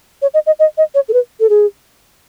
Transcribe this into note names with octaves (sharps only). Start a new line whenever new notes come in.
C#5
D#5
D#5
D#5
D#5
C#5
A4
B4
A4
G#4